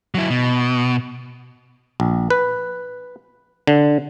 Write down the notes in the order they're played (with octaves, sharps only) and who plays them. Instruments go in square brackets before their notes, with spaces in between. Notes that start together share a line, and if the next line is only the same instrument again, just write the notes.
[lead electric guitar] F#3 E4
B2
[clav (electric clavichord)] A#1
B4
D3